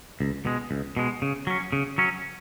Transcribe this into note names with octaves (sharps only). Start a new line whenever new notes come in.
C#2
B2 G#3
C#2
B2 G#3
C#3
F#3 C#4
C#3
F#3 C#4